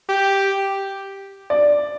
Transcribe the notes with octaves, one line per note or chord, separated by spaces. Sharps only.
G4
D5